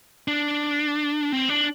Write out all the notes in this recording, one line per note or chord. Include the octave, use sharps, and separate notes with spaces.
D4
C4
D4